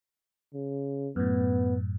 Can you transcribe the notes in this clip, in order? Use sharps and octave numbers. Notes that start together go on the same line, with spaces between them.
C#3
F#2 A2 B3